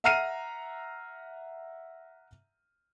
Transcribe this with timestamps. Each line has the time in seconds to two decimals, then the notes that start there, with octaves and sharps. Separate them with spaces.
0.04 E5 F#5 A#5 F6 C7 D#7